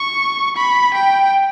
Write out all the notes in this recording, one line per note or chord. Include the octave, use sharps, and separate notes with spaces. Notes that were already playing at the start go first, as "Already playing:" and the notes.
Already playing: C#6
B5
G5